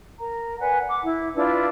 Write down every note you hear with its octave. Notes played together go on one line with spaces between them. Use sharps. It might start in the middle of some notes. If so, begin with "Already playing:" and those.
A#4 A#5
B4 D5 F#5 G#5
F#5 D6
E4
D4 E4 F4 B4